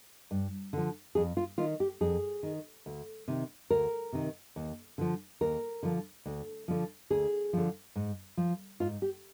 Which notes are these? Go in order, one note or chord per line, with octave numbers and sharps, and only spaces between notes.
G2
D3 F3
F2 G#4
F4
D#3 F4
G4
F2 G#4
D#3
D2
C3 D#3
D2 A#4
C3 D#3
D#2
D3 F3
D#2 A#4
D3 F3
D2
D3 F3
D2 G#4
D3 F3
G#2
F3
G#2 F4
G4